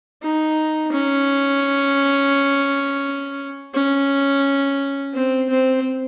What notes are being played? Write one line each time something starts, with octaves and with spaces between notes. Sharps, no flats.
D#4
C#4
C#4
C4
C4